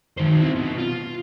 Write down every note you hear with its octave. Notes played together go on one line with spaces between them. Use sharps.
D#3 C5
C4 E4
B2
F4